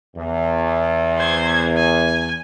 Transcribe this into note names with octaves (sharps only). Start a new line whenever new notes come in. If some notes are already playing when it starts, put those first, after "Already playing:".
E2
C5 G#6
G#5